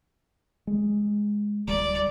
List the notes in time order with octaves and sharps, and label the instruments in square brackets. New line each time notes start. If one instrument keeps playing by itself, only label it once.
[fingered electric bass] G#3
[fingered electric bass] D1 G3 [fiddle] D5